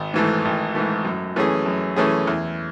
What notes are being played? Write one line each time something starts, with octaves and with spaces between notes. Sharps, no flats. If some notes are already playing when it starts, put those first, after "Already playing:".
Already playing: G#1
G#2 E3 A3
G#1
G#2 E3 A3
F#2
E3 A3 C#4 G#4
F#2
E3 A3 C#4 G#4
E2